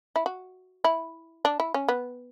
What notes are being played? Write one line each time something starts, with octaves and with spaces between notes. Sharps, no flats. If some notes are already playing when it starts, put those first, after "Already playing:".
E4
F#4
E4
D4
E4
C#4
B3